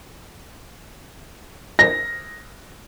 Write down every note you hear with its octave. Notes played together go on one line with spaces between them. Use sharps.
A#6